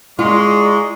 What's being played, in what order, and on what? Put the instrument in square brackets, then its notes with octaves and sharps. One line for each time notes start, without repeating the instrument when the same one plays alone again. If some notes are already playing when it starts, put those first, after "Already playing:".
[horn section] G#3 [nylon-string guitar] F4 [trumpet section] D5 A#5 C#6